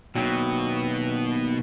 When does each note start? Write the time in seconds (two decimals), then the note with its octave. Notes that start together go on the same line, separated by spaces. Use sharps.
0.15 D#2 B2 F#3